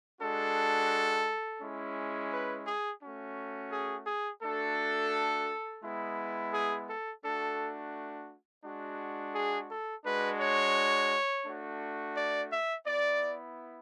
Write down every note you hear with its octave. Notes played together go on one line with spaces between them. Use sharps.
G#3 D4 F#4 A4
G#3 C#4 E4
B4
G#4
A3 C#4 F#4
G#4
G#4
A3 D4 F#4 A4
G#3 B3 E4
G#4
A4
A3 D4 F#4 A4
G#3 D4 F#4
G#4
A4
G#3 D4 F#4 B4
C#5
A3 D4 F#4
D5
E5
B3 E4 D5